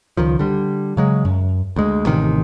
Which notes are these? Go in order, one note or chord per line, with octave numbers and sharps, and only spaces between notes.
C#2 D#3 F3
D3 G3
C#3 F#3 G#3
F#2
D2 G#3
A1 C3 D#3